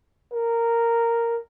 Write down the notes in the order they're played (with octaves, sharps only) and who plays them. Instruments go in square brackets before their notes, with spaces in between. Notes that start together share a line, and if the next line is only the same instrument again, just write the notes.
[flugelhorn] A#4